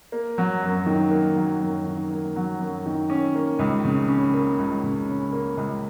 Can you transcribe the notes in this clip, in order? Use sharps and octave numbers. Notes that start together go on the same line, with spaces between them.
A#3
F#3
F#2
D#3
A#3
F#3
F#2
D#3
A#3
F#3
F#2
D#3
C#4
A#3
C#2
C#3
C#4
A#3
C#2
C#3
C#4
A#3
C#2